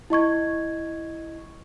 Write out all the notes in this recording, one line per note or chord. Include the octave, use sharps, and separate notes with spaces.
E4 D#5 C#6 G#6